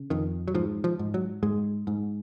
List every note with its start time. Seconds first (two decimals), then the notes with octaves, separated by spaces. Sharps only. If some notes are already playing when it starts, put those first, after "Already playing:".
Already playing: C#3
0.10 F2 D#3
0.48 F#3
0.54 G#2 F3
0.84 F3
0.99 G#2
1.14 F#3
1.43 G#2 G#3
1.87 G#2